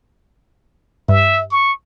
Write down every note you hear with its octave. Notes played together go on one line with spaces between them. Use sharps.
G2 E5
C#6